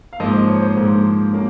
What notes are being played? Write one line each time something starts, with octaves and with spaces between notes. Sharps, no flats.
F5
G#2 F3 A#3 D#5
C5
C#5
C5
G#2 F3 A#3
F#3 A#3 C#4